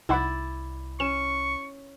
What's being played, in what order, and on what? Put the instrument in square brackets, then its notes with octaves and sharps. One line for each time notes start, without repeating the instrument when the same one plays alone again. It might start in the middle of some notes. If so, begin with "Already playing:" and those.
[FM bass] C2 [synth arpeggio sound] D#4 F#5 B5 [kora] E4 D5
[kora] C#4 [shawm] C#6 [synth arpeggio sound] E7